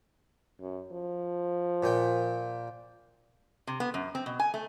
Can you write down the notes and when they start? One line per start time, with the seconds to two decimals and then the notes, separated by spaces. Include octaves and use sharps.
0.61 F#2
0.92 F3
1.83 A#2 G5
3.67 C3
3.80 B3
3.94 F#2
4.15 C4
4.26 B2
4.39 G#5
4.54 A3